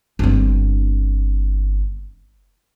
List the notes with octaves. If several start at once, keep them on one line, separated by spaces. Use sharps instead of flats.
G1 C4